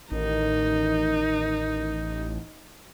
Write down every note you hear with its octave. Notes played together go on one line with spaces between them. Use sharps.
A1 D#3 D#4